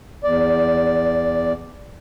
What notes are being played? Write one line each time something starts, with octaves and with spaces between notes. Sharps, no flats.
E2 D5